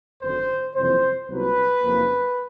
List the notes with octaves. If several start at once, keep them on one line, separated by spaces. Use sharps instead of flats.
G#1 F#2 D3 C5
F#1 F2 C3 E3 G3 C5
C2 A#2 F#3 B3 B4
F#1 F2 C#3 F3 A#3